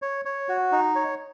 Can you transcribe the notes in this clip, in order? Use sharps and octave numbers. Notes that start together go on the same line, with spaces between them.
C#5
C#5
F#4
D#4
C#5